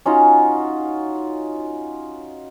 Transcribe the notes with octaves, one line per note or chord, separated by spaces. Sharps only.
C#4 D#4 F4 F#4